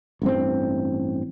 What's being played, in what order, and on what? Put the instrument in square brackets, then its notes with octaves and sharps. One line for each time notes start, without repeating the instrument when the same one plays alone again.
[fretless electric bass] A1 G2 C4